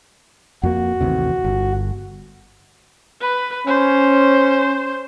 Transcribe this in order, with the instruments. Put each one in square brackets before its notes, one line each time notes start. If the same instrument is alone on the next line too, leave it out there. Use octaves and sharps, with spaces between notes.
[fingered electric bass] F2 A#3 [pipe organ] F#4
[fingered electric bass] A1 D#2 C3
G1
[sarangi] B4
[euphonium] C#4 [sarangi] C5